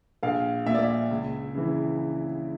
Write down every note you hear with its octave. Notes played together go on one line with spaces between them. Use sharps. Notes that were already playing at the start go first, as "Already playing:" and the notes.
A#1 F5
A#2 E5
D5
E5
C#2
C#3 E3